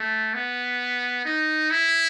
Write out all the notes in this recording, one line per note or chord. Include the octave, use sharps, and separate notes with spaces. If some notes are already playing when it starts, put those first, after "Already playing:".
Already playing: A3
B3
D#4
E4